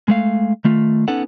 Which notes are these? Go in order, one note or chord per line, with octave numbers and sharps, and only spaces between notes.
G#3 A3 F5
D#3 A3 F4
B3 C#4 D#4 A4 F#5